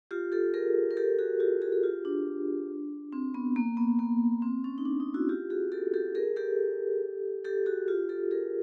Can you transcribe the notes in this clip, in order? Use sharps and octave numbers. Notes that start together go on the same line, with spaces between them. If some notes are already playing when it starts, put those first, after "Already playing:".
F4 G4
G4 A4
G#4 A#4
A#4
G4 A4
F#4 G#4
F4 G4
F#4 G#4
G#4
F4 G4
D4
C4
B3
A#3
B3
A#3
C4
C#4
D#4
D4
D#4
E4 F#4
F4 G4
F#4 G#4
G4 A4
G4 A4
G#4 A#4
G4 A4
G4 A4
F#4 G#4
F4 G4
G4 A4
G#4 A#4